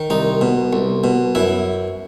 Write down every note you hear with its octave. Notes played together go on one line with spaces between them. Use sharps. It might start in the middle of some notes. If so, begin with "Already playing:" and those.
Already playing: D#3
C2 D#4
B2
C2
B2
F#2 E4